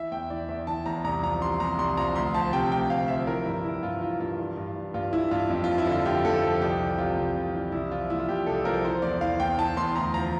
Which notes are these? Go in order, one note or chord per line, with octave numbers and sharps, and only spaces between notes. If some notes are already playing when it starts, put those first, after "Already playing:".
Already playing: E3 E5
E2 G5
E3 D5
E2 E5
E3 A5
E2 A#5
C2 A#5
F3 A#5
C3 C6
C2 A#5
C2 C6
F3 A#5
D2 C6
F3 A5
C3 G5
D2 G5
D2 F5
F3 E5
E3 A#4
G2 E4
E3 E4
G2 F4
E3 F4
G2 F4
E3
G2
E3
G2 F4
E3 E4
G2 F4
F2
F3 F4
E4
D3
F4
F2 G4
F2 A4
F3
C2 G4
E3
C3 F4
C2
C2
E3
C2 E4
F3 F4
A#2 E4
F4
C2 G4
C2 A4
F3 A#4
E3 C5
E2 D5
E3 F5
E2 G5
E3 A5
E2 C6
D2 A#5
F3 A#5